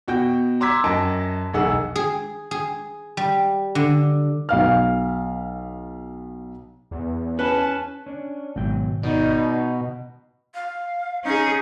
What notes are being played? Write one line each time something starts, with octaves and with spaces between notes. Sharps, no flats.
B2 F#4 G5 G6
A#5 C6 D6 E6 G#6 B6
F#2 D#5 G5 A5 D7
E1 B1 G#3 G#4 F#5 E6
G#4
G#4
G3
D3
B1 F5 F6
E2
C#4 G#4 B4 A5
C#4 D4
G#1 B2 F#3 G5
B2 D#4 D5
F5
C#4 D#4 G#4